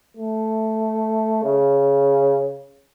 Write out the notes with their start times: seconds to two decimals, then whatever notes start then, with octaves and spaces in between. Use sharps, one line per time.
0.17 A3
1.44 C#3